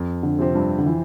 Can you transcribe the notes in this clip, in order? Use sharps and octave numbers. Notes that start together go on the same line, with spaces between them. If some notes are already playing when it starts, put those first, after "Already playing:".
Already playing: F2
D3
C3 F3 C4 G4
G2
D3
E3